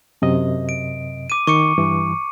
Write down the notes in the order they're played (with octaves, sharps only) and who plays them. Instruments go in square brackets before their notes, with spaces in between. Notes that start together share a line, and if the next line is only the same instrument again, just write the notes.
[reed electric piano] F#2 C3 D#5
[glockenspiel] D7
D6 D#7
[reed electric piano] D#3 [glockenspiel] C#6 D6 C#7
[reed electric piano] G2 E3